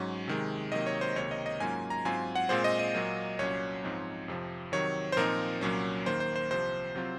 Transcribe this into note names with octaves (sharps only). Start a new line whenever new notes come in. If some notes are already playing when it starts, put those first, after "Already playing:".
Already playing: G#2 F#3 C#4
C3 D#3 G#3
C3 D#3 F#3 A#3 D#5
C#5
C5
C#2 C3 D#3 A#3 C#5
D#5
D#5
G#2 F#3 A#3 C#4 F4 G#5
A#5
G#2 F#3 C4 F4 G#5
F#5
A#2 G#3 C4 F4 C5
D#5
D#5
A#2 F#3 A#3
C2 A#2 F#3 C#4 C#5
G#2 F3 C4 D#4
F2 C3 F3
C3 D#3 F#3 C#5
C5
A#2 F3 C4 D#4 A#4
C2 A#2 F#3 C#4
D#2 D#3 A#3 C5
C5
C5
C2 C3 F3 C5
C3 F#3 C4 F4